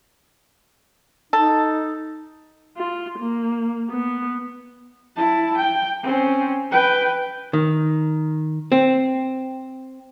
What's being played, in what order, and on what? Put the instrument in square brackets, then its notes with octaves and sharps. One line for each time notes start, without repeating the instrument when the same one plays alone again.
[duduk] D#4 [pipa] A4
[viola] F4
A#3
B3
[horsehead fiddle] E4 A5
G5
C4 C#4
B4 G5
[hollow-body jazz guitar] D#3
C4